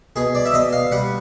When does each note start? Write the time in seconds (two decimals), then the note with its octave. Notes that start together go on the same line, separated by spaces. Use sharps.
0.16 B2 G#4
0.35 D5
0.45 E5
0.54 B2 D#5
0.73 F5
0.92 G3 F#5